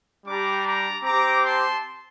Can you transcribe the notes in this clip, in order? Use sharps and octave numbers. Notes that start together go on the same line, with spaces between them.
G3 D4 G4 A#5 D6
A#5 D6
C4 G4 A#5 D6
A5 C6